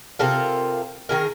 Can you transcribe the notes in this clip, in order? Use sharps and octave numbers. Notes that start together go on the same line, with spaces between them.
C3 F4 A4 A#4
D#3 G#4 A#4